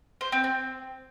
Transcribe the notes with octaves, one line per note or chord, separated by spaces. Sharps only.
C5
C4
C4